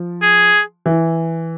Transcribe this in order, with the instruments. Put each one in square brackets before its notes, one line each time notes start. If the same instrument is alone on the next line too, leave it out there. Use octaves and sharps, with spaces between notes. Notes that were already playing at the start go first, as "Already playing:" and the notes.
Already playing: [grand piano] F3
[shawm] G#4
[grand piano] E3